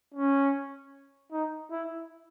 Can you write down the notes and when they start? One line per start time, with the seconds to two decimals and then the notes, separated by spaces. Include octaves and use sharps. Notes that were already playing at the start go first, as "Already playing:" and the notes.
0.14 C#4
1.32 D#4
1.71 E4